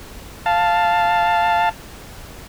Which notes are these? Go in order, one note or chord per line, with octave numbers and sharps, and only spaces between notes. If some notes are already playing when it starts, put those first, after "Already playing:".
F5 A5